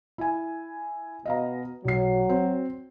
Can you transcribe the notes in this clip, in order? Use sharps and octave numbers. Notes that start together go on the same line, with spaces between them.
E4 G#5
B2 D#5 F5 A#5
B1 F#3 C7
C4 F#4